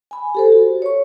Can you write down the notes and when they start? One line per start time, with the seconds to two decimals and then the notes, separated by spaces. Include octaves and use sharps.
0.11 G#5 B5
0.35 G4 A4 C5
0.52 F#4
0.82 C#5 C#6